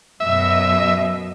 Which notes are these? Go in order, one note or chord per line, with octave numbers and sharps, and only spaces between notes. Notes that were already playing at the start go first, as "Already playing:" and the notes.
F#2 B2 D#5 E5